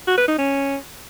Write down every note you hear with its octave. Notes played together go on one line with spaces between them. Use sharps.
F#4
B4
D#4
C#4